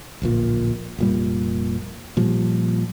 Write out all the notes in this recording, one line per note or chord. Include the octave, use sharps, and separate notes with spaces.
D1 A#1 A#2
F1 A#2 G3
A#2 F3 G3